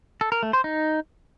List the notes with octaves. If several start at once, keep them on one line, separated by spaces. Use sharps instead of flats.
A4
A#4
A3
C5
D#4